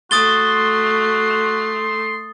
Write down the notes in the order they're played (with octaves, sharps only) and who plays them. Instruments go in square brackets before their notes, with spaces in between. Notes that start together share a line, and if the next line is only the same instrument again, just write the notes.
[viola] A3 [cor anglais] F#4 [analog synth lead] C6 [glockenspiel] D#6 A6 G7